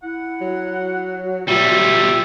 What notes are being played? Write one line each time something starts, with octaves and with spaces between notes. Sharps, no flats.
E4 F#5
F#3
B2 G3 F4 E5